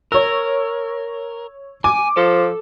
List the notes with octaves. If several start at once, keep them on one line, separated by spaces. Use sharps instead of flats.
A#4 C#5 E6
G#5 D6
F3 A4